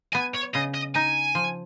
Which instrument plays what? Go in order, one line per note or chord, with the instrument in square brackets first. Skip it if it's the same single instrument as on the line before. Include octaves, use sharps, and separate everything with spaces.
[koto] B3 [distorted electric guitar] G#5
[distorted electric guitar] C#5
[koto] C#3 [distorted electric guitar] D#5
[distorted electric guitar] D#5
[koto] D#4 [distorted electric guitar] G#5
[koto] F3